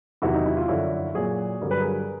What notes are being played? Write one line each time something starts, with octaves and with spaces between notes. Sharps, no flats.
E2 C3 D#3 F#3 E4 F#4
D#4
E4
F4
F#2 D3 F3 E4 F#4
A#2 F#3 F#4 G#4
G2 D3 F#3 A#4
B4
G#4 A#4